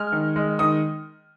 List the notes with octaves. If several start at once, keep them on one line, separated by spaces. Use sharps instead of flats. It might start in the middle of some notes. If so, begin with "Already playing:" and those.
Already playing: G#3 F6
D#3
G#3
D#3 D#6